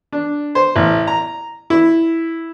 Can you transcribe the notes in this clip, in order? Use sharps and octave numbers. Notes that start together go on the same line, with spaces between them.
D4
C5
A1
A#5
E4